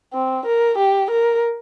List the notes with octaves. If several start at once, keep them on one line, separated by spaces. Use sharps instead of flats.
C4
A#4
G4
A#4